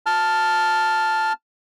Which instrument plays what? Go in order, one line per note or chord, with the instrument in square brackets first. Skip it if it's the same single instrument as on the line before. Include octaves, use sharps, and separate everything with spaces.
[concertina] A5 F6